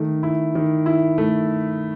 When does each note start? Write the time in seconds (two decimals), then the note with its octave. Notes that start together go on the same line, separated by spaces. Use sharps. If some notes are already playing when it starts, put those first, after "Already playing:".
Already playing: D#3 A3
0.23 E4
0.55 D#3
0.86 E4
1.18 A3